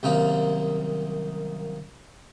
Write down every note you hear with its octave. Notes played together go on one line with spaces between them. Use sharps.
C2 F#2 D#3 A#3 F5